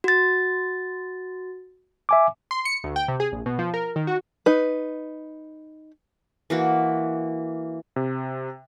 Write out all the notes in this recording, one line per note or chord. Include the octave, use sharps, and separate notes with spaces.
F#4 A6
E5 G#5 D6
C6
C#7
D2
G5
C3
G#4
A#1
B2
F3
A#4
D#3
F#4
D#4 B4
E3 A#3 F#4
C3